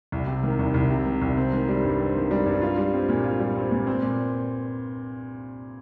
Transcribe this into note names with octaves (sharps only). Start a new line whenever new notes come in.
C2
C3
D#3
C2
C2
C3
D#3
C2
C4
D#3
G3
G2
C4
D#3
G3
G2
F4
G3
C4
A#2
F4
G3
C4
A#2
C4
A#2